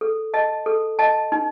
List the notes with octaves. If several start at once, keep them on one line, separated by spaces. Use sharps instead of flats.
A4
D#5 A5
A4
D#5 A5
D#4